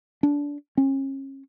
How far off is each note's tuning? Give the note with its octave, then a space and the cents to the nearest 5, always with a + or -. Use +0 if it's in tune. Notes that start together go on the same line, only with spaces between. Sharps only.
D4 -25
C#4 -35